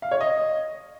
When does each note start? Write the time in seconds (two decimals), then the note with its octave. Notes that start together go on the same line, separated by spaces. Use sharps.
0.02 F5
0.11 C#5
0.21 D#5